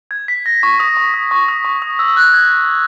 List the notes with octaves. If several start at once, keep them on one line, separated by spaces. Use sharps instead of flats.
G#6
B6
A#6
C#6
D#6
C#6
D#6
C#6
D#6
C#6
D#6
E6
F#6
G#6